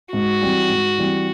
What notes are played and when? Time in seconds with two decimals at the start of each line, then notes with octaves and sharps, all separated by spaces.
0.13 G#2 F#4
0.42 E3 G3 C4
0.69 G#2
0.98 E3 G3 C4